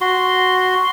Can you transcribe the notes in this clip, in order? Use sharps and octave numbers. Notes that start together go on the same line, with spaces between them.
F#4 C6